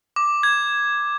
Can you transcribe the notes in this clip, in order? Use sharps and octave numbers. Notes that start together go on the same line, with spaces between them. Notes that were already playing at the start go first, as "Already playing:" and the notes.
D6
G#6